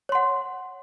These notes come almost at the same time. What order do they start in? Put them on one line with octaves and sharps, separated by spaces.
C#5 C6 F#5